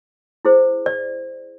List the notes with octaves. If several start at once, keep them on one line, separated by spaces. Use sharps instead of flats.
E4 G#4 C5
D5